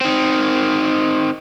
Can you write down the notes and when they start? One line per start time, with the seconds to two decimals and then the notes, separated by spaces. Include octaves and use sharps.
0.01 D#3 C4